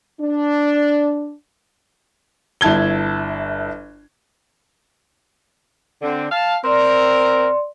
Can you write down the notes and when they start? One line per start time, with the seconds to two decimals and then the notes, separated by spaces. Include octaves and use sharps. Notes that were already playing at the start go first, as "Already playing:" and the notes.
0.20 D4
2.61 G1 E4 A5 G#6 G7
6.02 D3 C4
6.31 F5 A5
6.64 C4 A#4 D5 C6